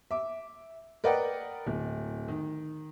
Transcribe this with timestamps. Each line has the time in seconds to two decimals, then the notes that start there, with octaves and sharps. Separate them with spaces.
0.11 E5 D6
1.04 A#4 B4 D5 D#5 F#5 G5
1.67 D1
2.28 D#3